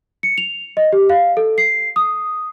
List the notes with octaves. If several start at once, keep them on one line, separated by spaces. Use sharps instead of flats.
C#7
F7
D#5
G4
F5
A4
C7
D#6